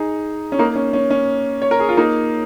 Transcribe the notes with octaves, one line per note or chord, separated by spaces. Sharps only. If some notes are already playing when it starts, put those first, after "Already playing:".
Already playing: D#4 G#4
C#4
A#3 D#4
C#4
C#4
C#4
C#5
A#4
G#4
F4
A#3 D#4